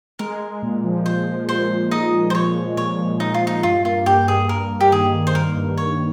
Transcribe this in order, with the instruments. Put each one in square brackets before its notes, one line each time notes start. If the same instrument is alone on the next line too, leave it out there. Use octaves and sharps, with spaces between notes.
[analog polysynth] G#3 [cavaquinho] A#4
[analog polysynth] G#3
A#2
F3
[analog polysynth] F3 [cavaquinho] C5
[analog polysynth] F3
[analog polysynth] A#2 [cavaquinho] C5
[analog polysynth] A#2
[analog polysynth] A#2 [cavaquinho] D#4 D#5
[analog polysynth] G#3
[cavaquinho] C5
[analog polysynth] F3 [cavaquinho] C#5
[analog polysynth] G#3
[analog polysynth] A#2 [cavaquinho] C#5
[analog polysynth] F3
[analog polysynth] F3 [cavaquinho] D#4
[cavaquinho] F4
[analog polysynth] F3 [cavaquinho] D#4
[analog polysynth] G2 [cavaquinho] F4
[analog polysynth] A#3 [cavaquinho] F4
[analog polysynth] G2 [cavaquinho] G4
[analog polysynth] G2 [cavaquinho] G#4
[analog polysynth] G2 [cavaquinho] A#4
[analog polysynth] G2
[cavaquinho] G4
[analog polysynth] D#3 [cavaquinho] G#4
[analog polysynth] G2
[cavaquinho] C5
[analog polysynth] G2 [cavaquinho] A#4
[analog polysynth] G2
[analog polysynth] G2 [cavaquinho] C#5